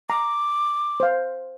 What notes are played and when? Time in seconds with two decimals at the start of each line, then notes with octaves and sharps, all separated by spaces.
0.10 A#5 D6
1.00 C5 F5